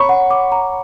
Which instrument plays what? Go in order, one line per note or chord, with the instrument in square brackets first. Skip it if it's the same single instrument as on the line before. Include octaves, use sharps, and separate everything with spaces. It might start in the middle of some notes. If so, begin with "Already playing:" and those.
Already playing: [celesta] C#5 A#5 [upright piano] B5 C#6
[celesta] F#5
D6
A#5